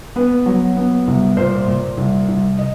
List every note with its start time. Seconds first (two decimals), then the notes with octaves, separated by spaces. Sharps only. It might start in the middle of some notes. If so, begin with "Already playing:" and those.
0.16 B3 B4
0.46 F#3
0.77 B3
1.08 C2
1.37 A#2 C5
1.68 A#2
1.97 C2
2.28 C2
2.59 D#5